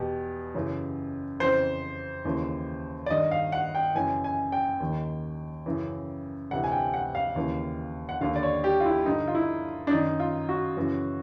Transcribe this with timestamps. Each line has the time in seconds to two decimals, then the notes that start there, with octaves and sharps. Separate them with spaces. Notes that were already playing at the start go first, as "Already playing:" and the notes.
Already playing: E2 B2 G4
0.54 F#2 C#3 E3
1.40 F2 C#3 E3 C5
2.25 D#2 C#3 E3
3.06 D5
3.10 G2 D#3 D#5
3.31 F5
3.52 F#5
3.75 G5
3.95 F#2 C#3 E3 G#5
4.24 G#5
4.52 G5
4.80 D#2 D#3
5.66 F#2 C#3 E3
6.51 D2 C3 E3 F#5
6.64 G#5
6.72 G5
6.94 F#5
7.15 F5
7.36 D#2 C#3 E3
8.09 F#5
8.21 D#2 D3 F5
8.36 D5
8.43 C#5
8.64 G4
8.80 F4
8.85 E4
9.06 G2 D3 D#4
9.27 F4
9.35 E4
9.87 D4
9.91 F#2 D#3 D#4
10.20 F4
10.49 F#4
10.76 F#2 C#3 E3